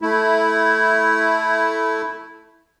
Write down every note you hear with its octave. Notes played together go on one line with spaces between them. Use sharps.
A3 E4